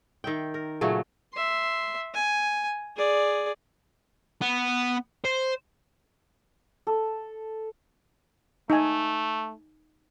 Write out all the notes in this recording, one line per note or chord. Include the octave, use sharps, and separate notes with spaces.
D#3 E5 G5
A#4
A#2 C#3 F#3 A3
E5 C6
G#5
G#4 D5
B3
C5
A4
A3 D#4 G#5